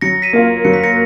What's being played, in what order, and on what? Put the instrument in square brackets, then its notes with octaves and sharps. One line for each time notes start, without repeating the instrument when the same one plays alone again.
[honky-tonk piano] F#3 [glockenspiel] A#6 C#7
[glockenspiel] B6 D#7
[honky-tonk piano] A#3 F4
[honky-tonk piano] F#3 [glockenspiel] C#7
[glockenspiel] B6
A#6 C#7